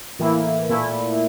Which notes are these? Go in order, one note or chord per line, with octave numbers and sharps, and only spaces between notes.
A2 E3 A#3 E4
A#2 A3 E4